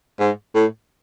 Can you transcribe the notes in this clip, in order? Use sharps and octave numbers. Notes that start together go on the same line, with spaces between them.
G#2
A2